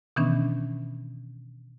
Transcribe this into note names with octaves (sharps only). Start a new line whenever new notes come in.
B2 D#3 E3 B3 C#4 D4